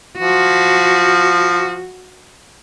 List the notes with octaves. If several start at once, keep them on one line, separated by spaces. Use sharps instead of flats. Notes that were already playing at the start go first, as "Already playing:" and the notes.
F3 F#4